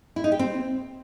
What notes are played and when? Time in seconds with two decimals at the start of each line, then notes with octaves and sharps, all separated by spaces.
0.16 E4
0.24 D#4
0.32 G4
0.39 C4